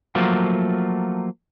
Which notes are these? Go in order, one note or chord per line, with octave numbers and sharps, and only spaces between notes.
F3 F#3 A3 A#3 F4